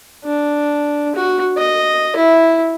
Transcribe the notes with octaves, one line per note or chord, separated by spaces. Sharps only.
D4
F#4
D#5
E4